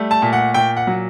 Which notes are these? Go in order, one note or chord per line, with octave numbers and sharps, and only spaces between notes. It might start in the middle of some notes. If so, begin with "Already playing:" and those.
Already playing: G3 A3
A5
A#2
F#5
A#2 G5
F#5
F#3